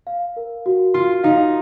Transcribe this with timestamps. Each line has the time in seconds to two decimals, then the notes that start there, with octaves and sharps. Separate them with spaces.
0.07 F5
0.37 A#4
0.66 F#4
0.94 F4 C6
1.24 D#4 F5